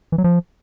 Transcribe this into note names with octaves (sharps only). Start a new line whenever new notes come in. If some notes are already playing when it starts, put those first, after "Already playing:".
E3
F#3
F3